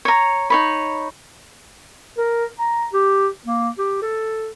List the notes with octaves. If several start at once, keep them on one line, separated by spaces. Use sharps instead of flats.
C#5 A#5
D#4 C#5 B5
A#4
A#5
G4
A#3
G4
A4